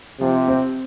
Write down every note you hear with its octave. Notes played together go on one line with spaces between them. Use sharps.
C3 F3
C4